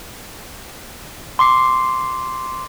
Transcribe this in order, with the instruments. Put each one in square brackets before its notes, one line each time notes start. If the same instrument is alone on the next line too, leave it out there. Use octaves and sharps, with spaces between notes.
[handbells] C6 D6 C7